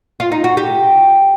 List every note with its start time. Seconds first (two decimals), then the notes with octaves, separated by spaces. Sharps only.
0.20 F4
0.32 D#4
0.44 F#4
0.57 G4